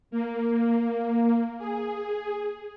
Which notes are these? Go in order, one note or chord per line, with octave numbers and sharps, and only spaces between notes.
A#3
G#4